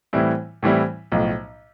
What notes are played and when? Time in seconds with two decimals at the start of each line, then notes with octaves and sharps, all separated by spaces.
0.13 A2 E3 G3 C4 E4
0.63 A2 E3 G3 C4 E4
1.12 B1 A2 F3